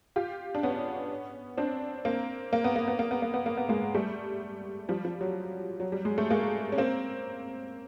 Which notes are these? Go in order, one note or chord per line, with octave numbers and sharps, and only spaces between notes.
F4 G4
D4
B3 C#4
C4 D4
A#3 C4
A#3
B3
A#3
B3
A#3
B3
A#3
B3
A#3
B3
G#3 A#3
G3 A3
F3 G3
F3
F#3
F#3
G3
G#3
A3
G#3 A#3
C#4
A#3 C4